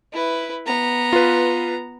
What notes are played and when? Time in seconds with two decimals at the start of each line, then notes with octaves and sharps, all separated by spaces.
0.13 E4 B4
0.66 B3 A#5
1.13 F4 B4